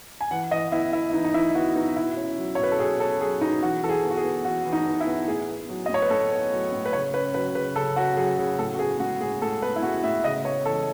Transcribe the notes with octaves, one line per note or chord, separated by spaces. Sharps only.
G#5
E3 F#5
E3 D#5
B3 E4
B3 E4
E3 D#4
D#4
E3 E4
B3 F#4
B3 D#4
B2 E4
C#4
F#3
C#5
B2
B4
A4
B2 G#4
C#4 A4
F#3 G#4
B2 D#4
E3 F#4
E3 A4
G#4
B3
F#4
G#4
B3
E3 F#4
E3
D#4
B3
E4
B3
A2 G#4
B3
F#3
D#5
A2 C#5
B4
A2 A4
B3
F#3
A2
B4
C#3 C#5
C#4 B4
F#3 B4
C#3 B4
C#3 A4
C#4 F#4
F#3 G#4
C#3 G#4
A2 A4
F#4
B3 G#4
G#3 F#4
A2 G#4
A2 A4
B3 B4
E4
G#3 F#4
A2 E5
C#3 D#5
B3 C#5
E3 A4